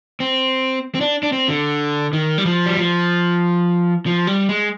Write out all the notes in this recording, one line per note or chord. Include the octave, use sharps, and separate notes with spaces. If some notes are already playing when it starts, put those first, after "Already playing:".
C4
C4
D4
D4
C4
D3
D#3
G3
F3
G3
F3
F3
G3
G#3